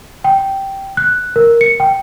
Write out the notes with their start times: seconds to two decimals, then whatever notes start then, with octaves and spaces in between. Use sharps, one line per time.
0.24 G5
0.97 F#6
1.36 A#4
1.61 C#7
1.80 G5